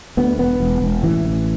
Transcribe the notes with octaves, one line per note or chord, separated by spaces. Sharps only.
D2 B3
E1 B3
E1
E1
A1 E3
A1